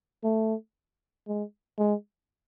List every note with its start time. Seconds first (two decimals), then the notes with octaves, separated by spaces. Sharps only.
0.24 A3
1.28 G#3
1.78 G#3